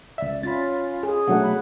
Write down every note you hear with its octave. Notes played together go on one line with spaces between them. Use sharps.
C#2 D5 E5
C#4 F4 B5 A6
G#4
B2 F#3 A3 D4 F#5
B5